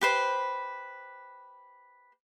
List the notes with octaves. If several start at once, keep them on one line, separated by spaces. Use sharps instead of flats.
G4 B4 C5